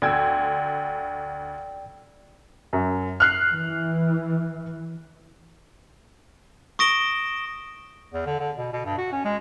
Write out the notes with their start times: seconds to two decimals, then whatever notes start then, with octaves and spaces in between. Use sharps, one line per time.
0.02 D2 D5 G5 E6 G#6
2.73 F#2
3.20 F6 F#6 C7
3.51 E3
6.79 C#6 D#6 A#6 D7 E7 G7
8.13 E2
8.26 D3
8.39 D3
8.57 B2
8.72 B2
8.85 G2
8.98 F#4
9.12 C#4
9.24 G#3